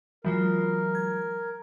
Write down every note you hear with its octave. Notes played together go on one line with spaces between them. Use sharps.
E3 F#3 G#3 F4 A#4
G#6